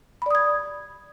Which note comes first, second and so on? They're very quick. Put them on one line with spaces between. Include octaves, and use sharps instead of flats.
B5 D5 D#6 G#6